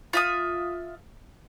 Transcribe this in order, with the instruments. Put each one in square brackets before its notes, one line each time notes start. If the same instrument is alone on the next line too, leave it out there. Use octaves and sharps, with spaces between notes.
[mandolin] F4 E5 D#6